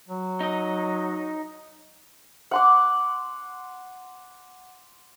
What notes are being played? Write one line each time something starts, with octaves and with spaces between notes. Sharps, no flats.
F#3
D#4 D#5
F#5 C6 D6